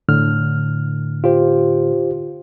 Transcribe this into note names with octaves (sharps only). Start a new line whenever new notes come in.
A2 D3 F6
F4 G4 C5